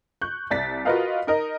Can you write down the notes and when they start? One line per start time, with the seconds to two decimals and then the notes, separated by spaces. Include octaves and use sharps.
0.21 C#6 F#6 G6
0.50 C2 D5 A6 B6
0.85 F4 F#4 A#4 B4 D#5 F5
1.27 D#4 A#4 D#5